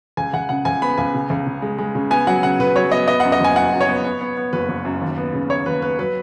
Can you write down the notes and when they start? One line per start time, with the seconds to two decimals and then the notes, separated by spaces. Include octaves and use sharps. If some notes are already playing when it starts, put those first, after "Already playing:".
0.17 C#2 G#5
0.33 C#2 F#5
0.49 C#3 F#5
0.65 C#2 G#5
0.82 B3 B5
0.98 C#2 G#5
1.14 C#3
1.30 C#2
1.46 C#3
1.62 G#3
1.78 G#3
1.95 C#3
2.11 B3 G#5
2.27 F#3 F#5
2.43 C#3 F#5
2.59 C#3 B4
2.76 F#3 C#5
2.92 B3 D#5
3.08 B3 D#5
3.20 F#2 F#5
3.32 D#5
3.41 F#1 G#5
3.56 F#2 F#5
3.72 F#2
3.81 C#5
3.88 B3
4.05 B3
4.21 B3
4.37 B3
4.53 F#1 B4
4.69 F#1
4.85 F#2
5.01 D#2
5.18 B3
5.34 C#3
5.50 B3 C#5
5.66 D#2 B4
5.82 B3 B4
5.99 F#3 B4